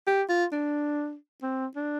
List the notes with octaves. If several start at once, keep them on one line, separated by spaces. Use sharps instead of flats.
G4
F4
D4
C4
D4